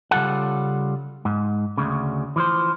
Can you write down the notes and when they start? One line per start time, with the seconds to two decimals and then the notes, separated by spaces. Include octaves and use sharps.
0.11 C#3 G3 F4 A4 F#5
1.25 G#2
1.77 D2 C#3
2.36 E3 F3 C5